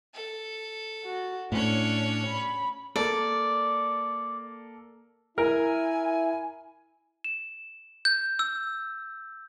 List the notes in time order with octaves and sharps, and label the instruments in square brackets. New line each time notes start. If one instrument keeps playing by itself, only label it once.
[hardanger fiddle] A4
[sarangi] F#4
[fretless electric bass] A2 [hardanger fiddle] C#4 C#5 [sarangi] D4
[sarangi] B5
[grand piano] A#3 A4 [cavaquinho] D5
[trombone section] E4 [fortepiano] A#4 [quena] G#5
[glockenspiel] E7
G6
E6